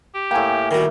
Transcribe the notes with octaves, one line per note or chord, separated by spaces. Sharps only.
G4
A2 A#3 G5 G#5
D#3 G3 F#4